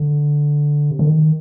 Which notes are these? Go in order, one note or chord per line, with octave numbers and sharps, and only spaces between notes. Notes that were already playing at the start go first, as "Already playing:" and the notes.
Already playing: D3
C3
D3
D#3